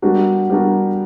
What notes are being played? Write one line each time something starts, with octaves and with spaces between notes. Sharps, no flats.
G3 B3 D4 F#4 A#4
G3 B3 D4 F#4 A#4